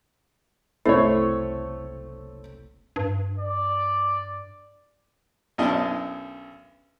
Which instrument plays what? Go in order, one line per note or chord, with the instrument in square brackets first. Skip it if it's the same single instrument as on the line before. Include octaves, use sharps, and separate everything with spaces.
[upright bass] F#1 C2 [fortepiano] A3 C#5 [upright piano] C4 [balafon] E4
[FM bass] G2
[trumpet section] D5
[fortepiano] B1 F#2 D4 E4 D#5 A5